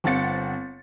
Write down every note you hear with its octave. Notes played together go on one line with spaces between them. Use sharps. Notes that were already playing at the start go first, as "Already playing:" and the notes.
G1 C4 F#5 A6 C#7